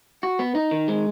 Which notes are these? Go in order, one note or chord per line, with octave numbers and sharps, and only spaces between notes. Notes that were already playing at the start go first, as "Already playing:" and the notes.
F#4
B3
D#4
D#3
G#3